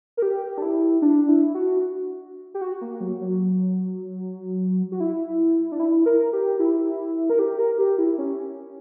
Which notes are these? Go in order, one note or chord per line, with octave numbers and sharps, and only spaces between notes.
A#4
G4
D4
E4
D4
E4
F#4
G4
F#4
A#3
F#3
F#3
F#4
E4
D4
E4
A#4
G4
E4
A#4
G4
A#4
G4
E4
C#4